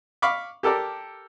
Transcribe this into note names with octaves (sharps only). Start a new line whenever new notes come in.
F5 B5 C#6 D6
G4 A4 A#4 D5